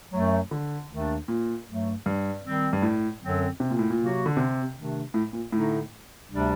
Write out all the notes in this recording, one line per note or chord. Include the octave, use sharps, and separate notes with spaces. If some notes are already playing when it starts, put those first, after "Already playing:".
F#2 F#3 A3
D3
D#2 D#3 A3 D4
A#2
G2 F#3 A3
G2
D#3 G3 C4
G2
A2
F#2 D3 F#3 C4
C3
A#2
A2
A#2
C3 F#3 A#3 F#4
D3
C3
C3 D#3 A3 D4
A2
A#2
A2 D3 A3 D#4
D2 C3 G3 D4